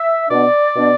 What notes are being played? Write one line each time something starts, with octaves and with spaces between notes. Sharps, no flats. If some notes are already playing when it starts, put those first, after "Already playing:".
Already playing: E5
B2 B3 D4 D5
B2 B3 D4